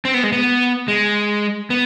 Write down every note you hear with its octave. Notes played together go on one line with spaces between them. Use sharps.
C4
B3
G#3
B3
G#3
B3